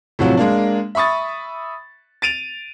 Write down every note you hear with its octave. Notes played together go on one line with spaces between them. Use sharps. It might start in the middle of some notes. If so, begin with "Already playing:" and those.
A2 C3 F3 F#3
G#3 A#3 D4
E5 B5 C#6 D#6 A6
A6 D7 D#7 F7